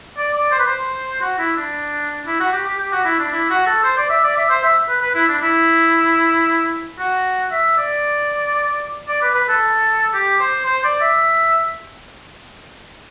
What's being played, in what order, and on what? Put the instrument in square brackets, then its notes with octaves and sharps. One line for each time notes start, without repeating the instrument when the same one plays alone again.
[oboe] D5
D5
C5
B4
C5
F#4
E4
D4
E4
F#4
G4
G4
G4
F#4
E4
D4
E4
F#4
A4
C5
D5
E5
D5
E5
C5
E5
B4
B4
E4
D4
E4
F#4
E5
D5
D5
B4
B4
A4
G4
C5
C5
D5
E5